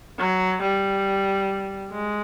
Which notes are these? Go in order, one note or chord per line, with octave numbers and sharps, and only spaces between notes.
F#3
G3
G#3